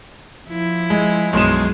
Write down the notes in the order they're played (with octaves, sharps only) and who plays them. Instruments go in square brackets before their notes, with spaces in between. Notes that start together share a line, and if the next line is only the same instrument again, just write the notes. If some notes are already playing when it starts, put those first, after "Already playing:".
[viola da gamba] F3 E4
[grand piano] G#3
[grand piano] B1 C6 E7 [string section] F#2 G#3